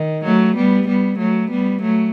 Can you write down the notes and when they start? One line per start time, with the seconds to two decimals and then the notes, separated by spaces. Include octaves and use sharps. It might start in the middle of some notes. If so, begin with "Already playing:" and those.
Already playing: D#3
0.24 F#3 A3
0.56 G3 B3
0.88 G3 B3
1.18 F#3 A3
1.50 G3 B3
1.81 F#3 A3